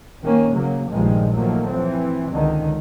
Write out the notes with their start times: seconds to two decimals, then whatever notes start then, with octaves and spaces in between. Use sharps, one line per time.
0.23 D#3 A#3 C#4
0.55 C#3 F#3 A#3
0.91 A#1 G2 D#3 F3 G#3
1.34 D#3 F3 F#3 A3 A#3
1.69 E3 C4
2.32 C#2 D3 D#3